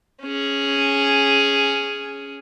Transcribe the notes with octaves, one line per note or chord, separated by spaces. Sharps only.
C#4 G#4